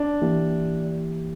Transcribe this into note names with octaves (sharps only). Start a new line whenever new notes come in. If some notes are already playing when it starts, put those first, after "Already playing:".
Already playing: D4
E3 A#3 E4 G4